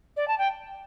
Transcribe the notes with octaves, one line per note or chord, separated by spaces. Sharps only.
D5
A5
G5